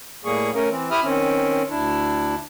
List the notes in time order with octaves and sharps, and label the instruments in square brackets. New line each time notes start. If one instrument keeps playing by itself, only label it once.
[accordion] A2 G3 A#3 G#4 C#6
A3 C#4 A#4
E3 C4
E4 G4 E5 B5 D#6 F6
D#3 C4 C#4
D2 D4 E4